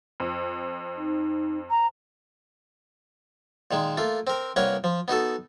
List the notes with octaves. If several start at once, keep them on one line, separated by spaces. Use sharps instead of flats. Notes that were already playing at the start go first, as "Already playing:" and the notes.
F2
D#4
A#5
A#2 D#3 G#3
A3 A#3 F4
C4 A#4
C2 A#3 A#4 B4 C#5 F#5
F3
B3 D#4 F#4 A4